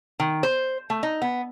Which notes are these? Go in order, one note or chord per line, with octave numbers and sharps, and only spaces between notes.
D#3
C5
A3
D#4
B3